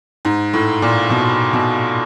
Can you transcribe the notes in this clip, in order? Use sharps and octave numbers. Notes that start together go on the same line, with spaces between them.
G#2
A2
A#2
B2
B2